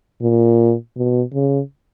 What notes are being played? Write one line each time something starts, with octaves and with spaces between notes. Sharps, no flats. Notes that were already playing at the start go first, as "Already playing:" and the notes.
A#2
B2
C#3